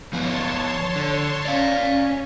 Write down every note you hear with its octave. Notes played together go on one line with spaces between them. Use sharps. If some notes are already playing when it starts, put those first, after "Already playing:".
F3 B3 C#5 A5 C6
D3
C#4 D5 F5